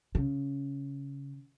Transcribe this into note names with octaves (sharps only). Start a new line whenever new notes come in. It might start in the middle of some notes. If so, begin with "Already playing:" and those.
C#3